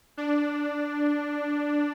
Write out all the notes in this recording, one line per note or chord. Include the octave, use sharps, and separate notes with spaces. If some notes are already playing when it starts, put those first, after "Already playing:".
D4